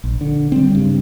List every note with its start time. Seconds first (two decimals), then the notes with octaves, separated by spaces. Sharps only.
0.04 A#1
0.21 D3
0.52 G3 C4
0.70 G2 C#3